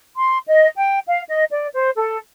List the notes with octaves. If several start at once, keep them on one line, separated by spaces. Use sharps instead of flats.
C6
D#5
G5
F5
D#5
D5
C5
A4